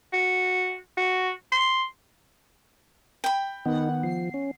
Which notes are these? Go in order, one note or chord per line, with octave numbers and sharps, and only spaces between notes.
F#4
F#4
C6
G5 B5
D#3 B3 D#4 F#5
F3 C7
C#4